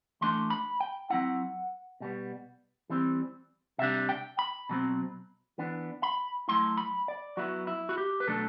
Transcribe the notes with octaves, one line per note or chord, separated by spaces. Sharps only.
E3 A3 D4 C6
B5
G5
F#3 A3 C4 E4 F#5
B2 G3 B3
E3 G3 C4
C3 G3 D4 E5
G5
B5
B2 F#3 C4
E3 B3 D4
B5
F#3 A3 E4 C6
B5
D5
F#3 B3 E4 F#4
E4
F#4
G4
B4
B2 F#3 A3 D4 A4